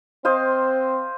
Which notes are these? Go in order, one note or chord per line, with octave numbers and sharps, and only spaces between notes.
C4 C5 D#5 F5